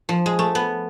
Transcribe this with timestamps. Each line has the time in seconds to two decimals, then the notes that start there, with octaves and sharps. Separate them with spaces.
0.09 F3
0.26 G#3
0.39 A3
0.55 B3